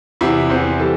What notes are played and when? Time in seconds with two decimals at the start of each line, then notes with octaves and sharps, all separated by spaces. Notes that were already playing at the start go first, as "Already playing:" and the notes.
0.21 E2 C3 E3 E4
0.50 E2 C3 E3 C4
0.80 E3 G3 A4